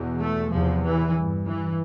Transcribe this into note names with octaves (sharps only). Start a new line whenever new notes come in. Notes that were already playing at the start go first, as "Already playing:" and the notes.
Already playing: E2 B2
A3
E2 C3 F3
E3
G2
E3